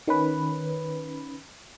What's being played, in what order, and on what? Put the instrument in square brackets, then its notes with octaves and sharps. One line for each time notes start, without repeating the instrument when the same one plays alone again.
[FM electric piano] D#3 C#4 B4